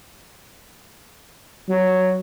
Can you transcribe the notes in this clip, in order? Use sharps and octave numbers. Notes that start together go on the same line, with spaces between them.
F#3